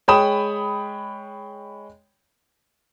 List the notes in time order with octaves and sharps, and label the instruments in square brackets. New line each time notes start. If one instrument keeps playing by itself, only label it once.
[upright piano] G#3 C#5 G5 B5 D#6 E7